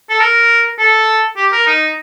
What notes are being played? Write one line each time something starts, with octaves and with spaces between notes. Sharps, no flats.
A4
A#4
A4
G4
A#4
D#4